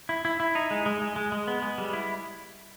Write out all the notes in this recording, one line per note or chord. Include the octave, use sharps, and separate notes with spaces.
E4
E4
E4
D#4
G#3
G#3
G#3
G#3
G#3
B3
G#3
G3
E4